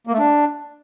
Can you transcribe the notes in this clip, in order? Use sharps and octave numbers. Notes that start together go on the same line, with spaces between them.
A#3
A3
D4